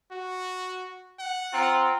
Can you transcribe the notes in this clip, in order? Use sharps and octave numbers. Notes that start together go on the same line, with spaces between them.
F#4
F#5
C4 F4 G5 A#5